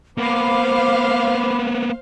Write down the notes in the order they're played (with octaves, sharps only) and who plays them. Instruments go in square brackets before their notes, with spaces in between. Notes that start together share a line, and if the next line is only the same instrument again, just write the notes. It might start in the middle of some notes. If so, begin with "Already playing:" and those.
[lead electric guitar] A#3 B3 [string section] C5 F5 [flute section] B5 D6